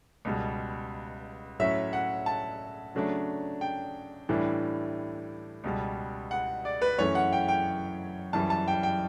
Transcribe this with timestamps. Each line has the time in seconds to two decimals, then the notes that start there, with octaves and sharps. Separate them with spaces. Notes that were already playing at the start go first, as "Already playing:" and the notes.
0.25 C#2 B2 G3
1.59 A2 F#3 C#4 E5
1.93 F#5
2.26 A5
2.95 C#3 F#3 A3 D4
3.61 G5
4.29 A2 E3 G3 D4
5.64 C#2 B2 G3
6.31 F#5
6.65 D5
6.82 B4
6.98 F#2 E3 A3 C#4 C#5
7.15 F#5
7.33 G5
7.48 G5
8.33 F#2 E3 G3 A5
8.50 A5
8.68 G5
8.83 G5